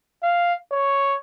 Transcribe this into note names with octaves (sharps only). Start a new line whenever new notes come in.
F5
C#5